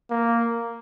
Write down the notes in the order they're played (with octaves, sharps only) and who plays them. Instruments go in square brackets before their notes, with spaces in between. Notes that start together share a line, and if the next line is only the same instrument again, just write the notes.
[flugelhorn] A#3